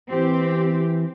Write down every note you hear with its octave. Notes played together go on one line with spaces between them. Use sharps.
E3 C4 G4